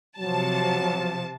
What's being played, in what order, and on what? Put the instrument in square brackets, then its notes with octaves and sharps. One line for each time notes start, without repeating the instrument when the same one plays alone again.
[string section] C3 A5 [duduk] F3 [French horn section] F#3